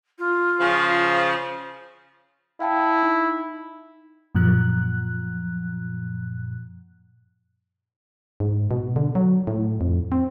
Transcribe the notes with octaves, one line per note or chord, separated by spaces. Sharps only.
F4
C#3 F3
E4 F5 G5 A5
D#4
F#2 A#2 F3 F#6
G#2
B2
D3
F#3
A2
F2
C4